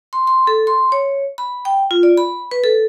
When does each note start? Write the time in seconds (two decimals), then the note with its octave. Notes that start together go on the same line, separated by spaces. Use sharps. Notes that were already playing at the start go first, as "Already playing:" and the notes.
0.13 C6
0.27 C6
0.47 A4
0.67 C6
0.92 C#5
1.38 B5
1.65 G5
1.91 F4
2.03 D5
2.17 B5
2.51 B4
2.64 A4